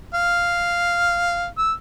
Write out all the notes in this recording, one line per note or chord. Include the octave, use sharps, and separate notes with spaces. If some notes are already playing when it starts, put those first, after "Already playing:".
F5
E6